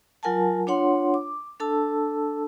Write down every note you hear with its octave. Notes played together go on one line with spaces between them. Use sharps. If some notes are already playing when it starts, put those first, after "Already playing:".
F#3 F4 A#4 F#5 G#5 A5
D4 F4 C#5 F#5 C6
D6
D4 A4 A5 E6